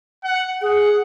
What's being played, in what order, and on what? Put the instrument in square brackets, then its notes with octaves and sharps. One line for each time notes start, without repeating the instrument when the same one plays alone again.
[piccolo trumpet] F#5
[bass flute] G#4 [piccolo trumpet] F#5